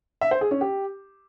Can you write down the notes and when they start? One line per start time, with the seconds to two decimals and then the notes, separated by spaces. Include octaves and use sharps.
0.21 E5
0.31 C5
0.41 G#4
0.51 C#4
0.61 G4